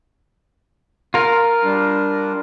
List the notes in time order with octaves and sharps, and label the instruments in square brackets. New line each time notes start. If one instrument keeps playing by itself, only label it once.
[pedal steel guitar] F4 A#4
[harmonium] G3 D4